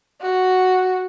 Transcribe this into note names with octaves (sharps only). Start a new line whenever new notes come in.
F#4